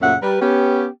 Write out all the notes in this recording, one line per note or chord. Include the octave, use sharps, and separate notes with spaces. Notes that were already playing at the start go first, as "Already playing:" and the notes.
F#2 A#2 C#3 A3 E5 F#5
G3 A#4 B4
B3 C#4 G4